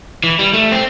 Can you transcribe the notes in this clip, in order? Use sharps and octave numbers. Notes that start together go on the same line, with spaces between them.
E3
G3
A3
C4